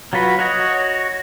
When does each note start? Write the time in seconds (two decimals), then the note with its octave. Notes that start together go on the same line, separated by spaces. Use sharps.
0.13 F#3 F4 F#4 B4
0.39 F#4 C#5 D#5